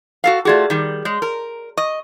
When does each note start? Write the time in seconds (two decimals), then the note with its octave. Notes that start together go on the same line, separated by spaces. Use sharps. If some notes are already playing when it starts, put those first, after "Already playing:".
0.24 F#4 A4 F5
0.45 A3 F4 F#4 G#4 D5
0.70 D#3 G3
1.05 G#3 C#5
1.22 A#4
1.77 D#5 C#6